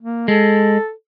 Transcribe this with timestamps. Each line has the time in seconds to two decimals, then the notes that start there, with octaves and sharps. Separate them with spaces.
0.01 A#3
0.28 G#3 A4